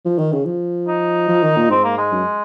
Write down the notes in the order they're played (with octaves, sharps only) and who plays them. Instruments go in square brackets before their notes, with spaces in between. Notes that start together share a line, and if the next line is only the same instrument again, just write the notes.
[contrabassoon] F3
D#3
C#3
F3
[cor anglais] D#4
[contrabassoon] F3
D#3
A#2
[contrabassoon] G#2 [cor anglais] C4
[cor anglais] A#3
G#3
[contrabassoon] F#2